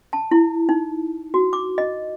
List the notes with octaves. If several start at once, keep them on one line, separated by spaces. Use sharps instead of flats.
A5
E4
D#4
F#4
D6
D#5